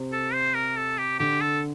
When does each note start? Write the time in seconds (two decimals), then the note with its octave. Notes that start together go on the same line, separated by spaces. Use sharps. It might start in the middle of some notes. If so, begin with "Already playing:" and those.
Already playing: C3
0.13 A4
0.33 C5
0.55 A#4
0.77 A4
0.98 G4
1.19 D3 G4
1.41 A4